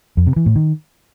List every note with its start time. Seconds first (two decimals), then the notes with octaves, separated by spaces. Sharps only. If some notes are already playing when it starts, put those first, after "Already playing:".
0.17 F2
0.27 C3
0.36 E3
0.46 A2
0.56 D#3